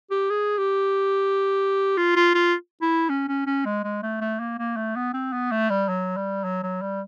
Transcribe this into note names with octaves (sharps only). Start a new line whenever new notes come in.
G4
G#4
G4
F4
F4
F4
E4
C#4
C#4
C#4
G#3
G#3
A3
A3
A#3
A#3
A3
B3
C4
B3
A3
G3
F#3
G3
F#3
F#3
G3